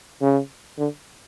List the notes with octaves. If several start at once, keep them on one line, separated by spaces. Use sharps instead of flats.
C#3
D3